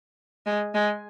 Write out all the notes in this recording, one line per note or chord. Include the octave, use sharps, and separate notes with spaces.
G#3
G#3